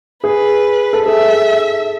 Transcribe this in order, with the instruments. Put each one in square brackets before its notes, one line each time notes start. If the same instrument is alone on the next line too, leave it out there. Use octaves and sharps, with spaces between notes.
[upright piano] G#4 [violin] B4
[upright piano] A4
[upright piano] G#4 [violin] E5